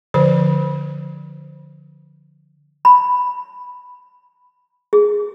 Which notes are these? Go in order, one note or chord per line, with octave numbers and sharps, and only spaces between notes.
D3 F3 C5
B5
G#4